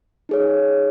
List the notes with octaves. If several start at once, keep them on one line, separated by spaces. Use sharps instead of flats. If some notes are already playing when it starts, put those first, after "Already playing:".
D#4 G#4 C#5